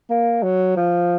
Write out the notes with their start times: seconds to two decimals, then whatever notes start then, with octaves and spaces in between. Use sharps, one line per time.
0.10 A#3
0.43 F#3
0.77 F3